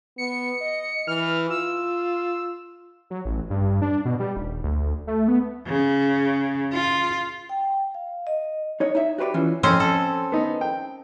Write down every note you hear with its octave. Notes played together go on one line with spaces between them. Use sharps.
B3 C#7
D#5
E3 F6
F4 E6
F#3
A1
G2
D4
B2
G3
D#1
D2
A3
B3
C#3
F4
G5
F5
D#5
D#4 C#5 D#5
D#4 E5
F#4 G4 B4 C5 D5
E3 C#4 F4 F#4
F2 C4 C#4 C5 C6
A4
B3 D#4
G5